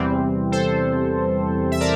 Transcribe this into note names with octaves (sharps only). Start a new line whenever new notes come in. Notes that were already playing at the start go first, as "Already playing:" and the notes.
Already playing: E2 C3 E3 G3 C4
A4 C5
E5
A#4 D5